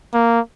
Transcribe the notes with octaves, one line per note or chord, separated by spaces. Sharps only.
A#3